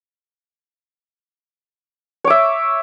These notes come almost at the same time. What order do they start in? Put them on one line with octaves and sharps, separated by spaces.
C#5 D6 E5